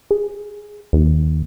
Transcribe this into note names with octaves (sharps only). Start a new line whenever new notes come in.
G#4
D#2